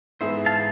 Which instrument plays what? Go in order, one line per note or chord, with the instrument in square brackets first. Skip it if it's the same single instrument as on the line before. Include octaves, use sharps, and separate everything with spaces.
[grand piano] G#2 E3 B3 E4 G#4 [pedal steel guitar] C5 E5
[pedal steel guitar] F5 A5